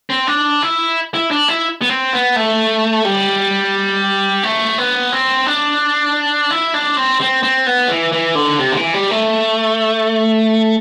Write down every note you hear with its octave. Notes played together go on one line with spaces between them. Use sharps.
C4
D4
E4
E4
D4
E4
B3
C4
B3
A3
G3
A3
B3
C4
D4
E4
D4
C4
C4
C4
B3
E3
E3
D3
C3
D3
E3
G3
A3